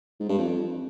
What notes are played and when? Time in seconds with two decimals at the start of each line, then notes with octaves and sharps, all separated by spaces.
0.20 G#2
0.29 G2
0.38 F2